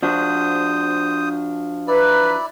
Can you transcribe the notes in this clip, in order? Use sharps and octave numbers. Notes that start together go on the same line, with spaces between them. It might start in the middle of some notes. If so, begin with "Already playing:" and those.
F3 D4 F#4 C5 D#6
E4 B4 D5 A#5